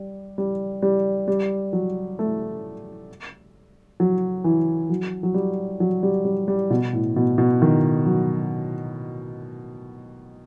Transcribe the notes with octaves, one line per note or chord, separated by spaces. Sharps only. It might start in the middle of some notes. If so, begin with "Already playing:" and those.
Already playing: G3
G3
G3
G3
F#3
A3
F#3
E3
F#3
F#3
G3
F#3
G3
G3
G3
B2
A2
B2
B2
D#3
F#3